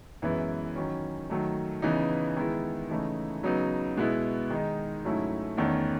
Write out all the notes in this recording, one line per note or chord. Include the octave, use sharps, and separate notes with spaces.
F#2 E3 G#3 B3 E4
D#3 F#3 C#4
D#3 F#3 A3
C#3 E3 B3 D#4
D#3 G#3 B3 E4
C#3 E3 A3 D#4
C#3 F#3 B3 D#4
B2 G#3 B3 E4
D#3 G#3 D#4
G#2 F#3 A3 C#4 E4
E2 D#3 A3 C#4